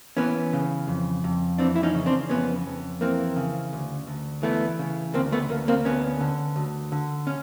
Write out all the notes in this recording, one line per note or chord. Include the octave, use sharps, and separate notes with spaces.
E3 B3 C#4
C#3
F2
F2
E3 C4 D4
E4
C#4 D#4
C#3
C4 D4
F2 B3 C#4
F2
E3 A#3 C4
C#3
D2
D2
E3 A3 B3
C#3
D2 A#3 C4
A3 B3
D2 A#3
A#3 C4
D2 B3 C#4
D3
D2
D3
C#4